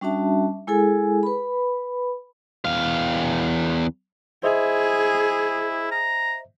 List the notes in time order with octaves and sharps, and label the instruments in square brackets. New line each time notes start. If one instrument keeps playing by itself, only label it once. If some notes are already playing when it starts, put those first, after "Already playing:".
[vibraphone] G3 C#4 D4 F#4 E5 A5
G#3 E4 G#4 A4 G#5
B4 B5
[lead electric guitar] E2 F5
[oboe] E4 [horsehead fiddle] G#4 [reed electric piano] C5 D#5 E5
[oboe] A#5